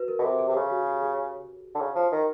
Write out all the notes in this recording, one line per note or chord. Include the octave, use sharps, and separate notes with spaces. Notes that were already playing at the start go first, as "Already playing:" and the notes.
Already playing: F#4 B4
A#4
B2
C3 A4
A4
C3
C#3 G4
F#4
G4
G#4
D3
C#3
F3
D#3